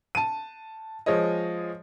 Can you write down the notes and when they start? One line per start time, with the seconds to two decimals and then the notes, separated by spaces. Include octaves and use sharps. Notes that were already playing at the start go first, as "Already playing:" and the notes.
0.15 A5 D#7
1.06 F3 G#3 C#5 D#5